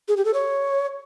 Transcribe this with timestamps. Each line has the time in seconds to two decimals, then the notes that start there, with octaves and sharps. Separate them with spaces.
0.08 G#4
0.17 G4
0.25 A4
0.34 C#5